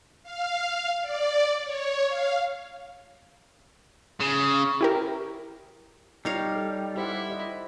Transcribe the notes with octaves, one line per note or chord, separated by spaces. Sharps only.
F5
D5
C#5
F5
C#3
E4 G4 A#4
G3 D#4 C#5 F5
A4
E4 G4 C5 F#5
C5 D5 D#5